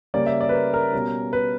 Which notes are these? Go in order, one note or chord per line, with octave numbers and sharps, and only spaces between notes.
C#3 G3 A#3 C#4 D5
E5
D5
B4
A#4
A#4
B2 G3 C#4
B4